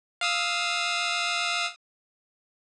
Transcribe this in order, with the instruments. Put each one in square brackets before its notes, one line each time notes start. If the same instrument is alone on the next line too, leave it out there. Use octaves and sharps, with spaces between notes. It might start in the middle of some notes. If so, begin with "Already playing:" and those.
[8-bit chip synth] F5 D#6 E6